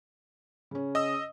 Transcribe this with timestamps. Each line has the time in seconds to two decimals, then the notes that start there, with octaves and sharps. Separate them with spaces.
0.71 C#3 C#4
0.95 D#5 D#6 E6